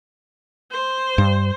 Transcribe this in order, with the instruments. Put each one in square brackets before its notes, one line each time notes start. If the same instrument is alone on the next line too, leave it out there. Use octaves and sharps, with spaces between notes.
[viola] C5
[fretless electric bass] G2